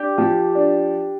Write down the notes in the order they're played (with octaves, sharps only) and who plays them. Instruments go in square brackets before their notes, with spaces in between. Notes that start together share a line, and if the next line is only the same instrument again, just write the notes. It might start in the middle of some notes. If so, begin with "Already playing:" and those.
Already playing: [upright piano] D4 [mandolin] G4
[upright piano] F3
D4